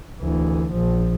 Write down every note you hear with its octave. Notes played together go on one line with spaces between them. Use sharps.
D2 E3
A#1 F3